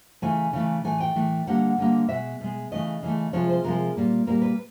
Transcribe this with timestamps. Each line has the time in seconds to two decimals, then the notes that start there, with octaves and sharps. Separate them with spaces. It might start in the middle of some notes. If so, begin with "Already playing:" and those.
0.22 C#3 E3 A3 G#5
0.53 C#3 E3 A3
0.85 A2 E3 A3 G#5
1.00 G5
1.16 A2 E3 A3
1.47 D3 G3 A#3 F#5
1.78 D3 G3 A#3
2.09 B2 G#3 E5
2.41 B2 G#3
2.71 C#3 E3 A3 D#5
3.03 C#3 E3 A3
3.33 C3 F3 G#3 C#5
3.49 C5
3.64 C3 F3 G#3 A#4
3.96 A#2 G3 A#3
4.27 A#2 G3 A#3 A#4
4.42 B4